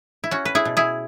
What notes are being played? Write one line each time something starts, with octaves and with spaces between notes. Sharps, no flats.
E4
C#4 F#4
B4
E4 G#4
B2
E4 G#4